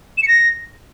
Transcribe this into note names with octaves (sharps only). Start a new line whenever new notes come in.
E7
C#7
A#6